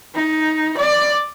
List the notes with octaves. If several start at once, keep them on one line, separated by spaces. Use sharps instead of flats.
D#4
D5